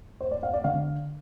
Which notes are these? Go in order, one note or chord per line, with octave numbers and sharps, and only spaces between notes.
C5
D5
F5
D5
D3 F5